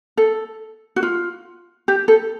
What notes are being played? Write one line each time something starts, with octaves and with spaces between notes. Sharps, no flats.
A4
F#4
F4
G4
A4